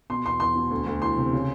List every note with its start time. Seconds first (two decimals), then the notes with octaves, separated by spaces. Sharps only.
0.10 B2 C6
0.25 E2 C6
0.40 E2 C6
0.56 B2
0.71 D2
0.86 D2
1.02 E3 C6
1.18 C3
1.33 C#3